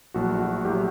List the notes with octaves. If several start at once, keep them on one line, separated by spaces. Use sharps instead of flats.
A#1 A2 F#3 F#4
F#4
A2 F#3 G4